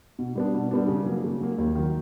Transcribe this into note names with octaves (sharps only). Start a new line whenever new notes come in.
B2
G3 B3 D4
B2
G3 B3 D4
C#3
F#3 A#3
C#3
F#3 A#3
D#2
D#3 F#3